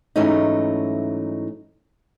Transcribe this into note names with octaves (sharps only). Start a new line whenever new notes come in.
G#2 E3 F#3 A3 C#4 D#4